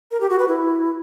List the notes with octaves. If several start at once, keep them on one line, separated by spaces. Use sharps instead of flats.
A#4
G4
F#4
B4
E4